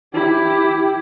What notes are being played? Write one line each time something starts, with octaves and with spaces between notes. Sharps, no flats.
E4 G4